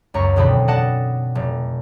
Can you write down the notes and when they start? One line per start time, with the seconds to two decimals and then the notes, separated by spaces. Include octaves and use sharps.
0.14 C#2 F#2 A#5 C#6
0.36 G#1 E2 B2 D3 C4 B5
0.68 D5 D#5 F#5 A5
1.35 F1